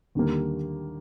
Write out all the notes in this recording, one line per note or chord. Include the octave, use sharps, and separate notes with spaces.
D#2 D3 G3 A#3